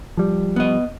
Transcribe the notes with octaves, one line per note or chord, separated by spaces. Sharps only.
F3 G3
B3 D#5